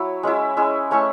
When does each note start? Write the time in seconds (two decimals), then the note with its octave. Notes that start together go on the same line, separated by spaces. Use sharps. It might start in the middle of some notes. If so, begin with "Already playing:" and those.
Already playing: F#3 E4 C#5
0.23 G#3 C#4 E4
0.57 G#3 C#4 E4
0.91 A3 C#4 E4 C#5 C#6